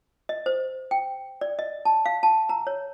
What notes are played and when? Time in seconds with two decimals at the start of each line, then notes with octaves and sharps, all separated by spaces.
0.29 D#5
0.46 C5
0.91 G5
1.41 D5
1.59 D#5
1.85 A5
2.06 F5
2.23 A5
2.49 A#5
2.67 C#5